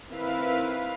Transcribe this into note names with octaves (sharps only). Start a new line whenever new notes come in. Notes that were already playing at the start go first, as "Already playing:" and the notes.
D#3 C4 E4 B4 F5